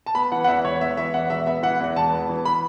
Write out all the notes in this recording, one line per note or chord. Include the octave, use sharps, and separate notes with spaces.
A5
B3 B5
E3 F#5
F#5
E2 E5
E1 C#5
B3 E5
E3 E5
E2 F#5
E1 E5
B3 E5
E3 F#5
E2
E1 A5
B3
E3
B5